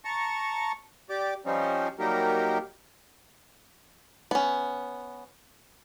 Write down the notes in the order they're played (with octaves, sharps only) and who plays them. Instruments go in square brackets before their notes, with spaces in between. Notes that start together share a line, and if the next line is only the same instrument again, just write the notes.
[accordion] A5 A#5 C#6
G4 D5 D6
F3 G3 C4 C#4 D#4
F#3 G3 A#3 D#4 G4 A#4
[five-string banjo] B3 C#4